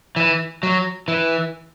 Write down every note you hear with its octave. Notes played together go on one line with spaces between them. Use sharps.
E3
F#3
E3